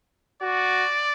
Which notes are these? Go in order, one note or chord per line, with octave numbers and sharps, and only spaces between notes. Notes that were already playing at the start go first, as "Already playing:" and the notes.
F#4 D5